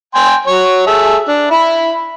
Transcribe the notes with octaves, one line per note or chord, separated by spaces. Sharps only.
G5 G#5 C6
F#3 C#5
G#4 A4 E5
D4
E4 B5